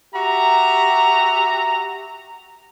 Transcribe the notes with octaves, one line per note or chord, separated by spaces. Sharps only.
F#4 G4 E5 A#5